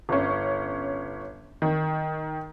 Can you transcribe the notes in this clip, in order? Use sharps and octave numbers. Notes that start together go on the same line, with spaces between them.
G1 C#4
D#3